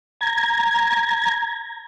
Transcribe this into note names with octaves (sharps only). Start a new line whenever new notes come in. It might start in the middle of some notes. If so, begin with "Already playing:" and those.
A#5 G#6